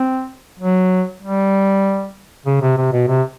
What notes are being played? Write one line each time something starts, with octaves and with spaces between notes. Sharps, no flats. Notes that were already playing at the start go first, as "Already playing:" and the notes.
Already playing: C4
F#3
G3
C#3
C3
C3
B2
C3